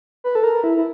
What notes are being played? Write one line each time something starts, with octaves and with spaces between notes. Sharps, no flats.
B4
A4
A#4
E4
E4